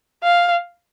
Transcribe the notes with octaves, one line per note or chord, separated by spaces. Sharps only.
F5